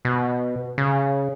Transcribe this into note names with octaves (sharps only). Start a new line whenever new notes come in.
B2
C#3